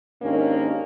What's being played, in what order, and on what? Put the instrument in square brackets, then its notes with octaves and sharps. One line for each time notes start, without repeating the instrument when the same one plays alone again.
[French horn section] D#2 G#2 A#3 C#4 D4